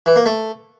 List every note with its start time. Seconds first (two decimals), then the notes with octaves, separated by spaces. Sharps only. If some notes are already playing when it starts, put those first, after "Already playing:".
0.06 E3
0.16 A#3
0.26 A3